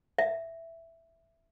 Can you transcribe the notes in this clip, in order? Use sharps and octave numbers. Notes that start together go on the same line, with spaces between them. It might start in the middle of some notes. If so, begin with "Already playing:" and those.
E5